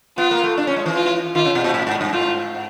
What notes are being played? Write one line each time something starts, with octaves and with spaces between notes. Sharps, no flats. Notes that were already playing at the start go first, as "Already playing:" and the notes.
B3 F4
A#3
A3
D4
C#4
G#3
E3
F4
D#3 F4
C#3
B2
A#2
A2
G#2
G2
G#2 F4